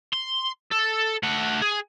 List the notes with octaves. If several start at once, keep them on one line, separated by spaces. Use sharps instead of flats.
C6
A4
A3 F#5
G#4